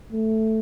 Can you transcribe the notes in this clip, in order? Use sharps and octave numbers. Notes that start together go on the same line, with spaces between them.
A3